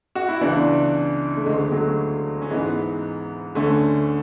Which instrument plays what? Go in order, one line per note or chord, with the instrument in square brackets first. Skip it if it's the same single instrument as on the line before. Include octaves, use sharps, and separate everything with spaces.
[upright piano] F#4
E4
C#2 C#3 E3 B3 D4
A3
D2 D3 G#3
B3
F#3 A3
C#4
G#2 E3 G#3 B3
D2 D3 A3 C#4